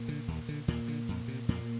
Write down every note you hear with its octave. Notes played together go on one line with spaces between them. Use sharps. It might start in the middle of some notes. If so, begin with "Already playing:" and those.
Already playing: A#2 A#3
D3
D#2
D3
D#2 A#2 A#3
D3
F2
C3
F2 A#2 A#3